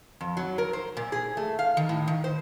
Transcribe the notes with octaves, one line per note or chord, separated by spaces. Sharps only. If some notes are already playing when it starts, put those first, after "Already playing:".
F2
F#3
A#4
C5
A#2
G#4
A3
F5
D#3
A2
D#3
C5